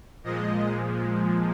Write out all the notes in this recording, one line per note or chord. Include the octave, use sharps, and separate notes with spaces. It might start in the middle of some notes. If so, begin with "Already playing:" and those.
A#2 F3 G#3 D#5